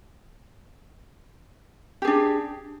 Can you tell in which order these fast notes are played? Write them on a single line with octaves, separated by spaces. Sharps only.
G4 G#4 D4